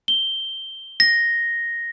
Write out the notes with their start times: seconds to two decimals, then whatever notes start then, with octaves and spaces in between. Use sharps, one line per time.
0.08 G7
1.00 A#6